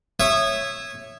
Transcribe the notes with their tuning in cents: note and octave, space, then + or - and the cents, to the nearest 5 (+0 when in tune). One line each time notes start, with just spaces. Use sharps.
C#5 -10 E5 +0 D#6 -20